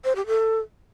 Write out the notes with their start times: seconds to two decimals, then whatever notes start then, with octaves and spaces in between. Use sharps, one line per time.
0.04 C5
0.16 G4
0.27 A4